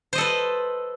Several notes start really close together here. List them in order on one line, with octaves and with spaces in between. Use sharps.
C5 D#5 A4 B4